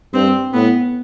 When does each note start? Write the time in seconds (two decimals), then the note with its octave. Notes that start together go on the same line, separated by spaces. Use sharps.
0.14 G2 C4
0.53 A2 B3